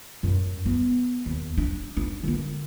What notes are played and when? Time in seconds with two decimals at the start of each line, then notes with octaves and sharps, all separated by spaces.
0.23 F#2
0.66 B3
1.26 D#2
1.58 D4
1.97 D4 D#4
2.23 D3 A#3